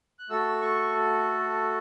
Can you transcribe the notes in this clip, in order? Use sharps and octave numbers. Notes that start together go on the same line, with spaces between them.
F#6
A3 F#4 A4 E6
C#6